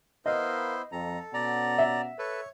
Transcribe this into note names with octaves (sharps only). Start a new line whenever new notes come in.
B3 E4 A#4 C5 D#5 F5
F2 A4 A#5
B2 C#4 D5 F#5 A#5
E5
A4 B4 C#5